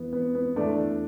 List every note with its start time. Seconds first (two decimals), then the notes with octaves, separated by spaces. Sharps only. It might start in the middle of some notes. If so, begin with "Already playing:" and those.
Already playing: E2 E3 B3
0.13 B3
0.35 B3
0.56 E2 E3 A3 D4